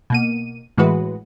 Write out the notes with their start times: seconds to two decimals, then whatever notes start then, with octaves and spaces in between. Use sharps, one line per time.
0.10 B2 A#3 D#7
0.78 A2 E3 G#3 F#4 B4